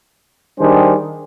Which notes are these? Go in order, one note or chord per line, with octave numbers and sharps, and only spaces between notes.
D#3 G3 D4 G#4 C5